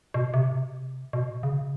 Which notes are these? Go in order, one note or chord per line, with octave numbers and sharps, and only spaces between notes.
B2
C3
B2
C#3